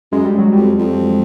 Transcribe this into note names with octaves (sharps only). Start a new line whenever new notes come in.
F#2 G#3
G3
F#3
F2 G3
F2